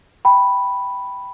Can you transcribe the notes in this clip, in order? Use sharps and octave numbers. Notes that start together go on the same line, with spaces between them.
G5 B5